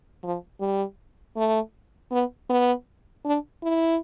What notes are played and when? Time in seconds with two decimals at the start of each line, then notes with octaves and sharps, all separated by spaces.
0.24 F3
0.60 G3
1.37 A3
2.12 B3
2.50 B3
3.25 D4
3.63 E4